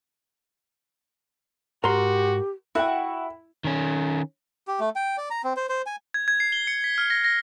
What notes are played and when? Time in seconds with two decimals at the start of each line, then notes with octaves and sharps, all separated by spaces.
1.84 G#2 F#4 G4 A#4 C6
2.75 E4 F#4 A4 F#5 G5
3.64 D#3 C#4
4.67 G4
4.80 A3
4.96 G5
5.18 D5
5.30 A#5
5.44 C4
5.57 C5
5.69 C5
5.86 G#5
6.14 G#6
6.28 G#6
6.40 C7
6.52 G7
6.67 C#7
6.84 B6
6.98 F6
7.10 A#6
7.24 A#6